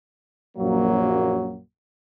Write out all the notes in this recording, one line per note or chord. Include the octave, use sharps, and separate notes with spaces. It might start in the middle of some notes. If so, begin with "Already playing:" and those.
A#1 F#2 F#3 A#3